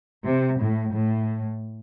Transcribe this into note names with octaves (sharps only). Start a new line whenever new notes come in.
C3
A2
A2